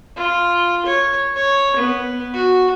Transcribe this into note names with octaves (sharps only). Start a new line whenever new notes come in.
F4
C#5
C#5
B3
F#4